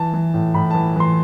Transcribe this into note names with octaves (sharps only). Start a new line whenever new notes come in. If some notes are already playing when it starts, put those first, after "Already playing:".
Already playing: E3 A5
E3
A2
A2 B5
E3 A5
E3 C6